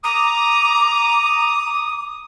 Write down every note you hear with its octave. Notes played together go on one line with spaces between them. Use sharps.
A#5 D6 D#6